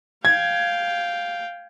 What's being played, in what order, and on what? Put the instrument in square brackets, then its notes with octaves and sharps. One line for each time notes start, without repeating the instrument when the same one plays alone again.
[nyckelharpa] F5 G5 [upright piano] G#6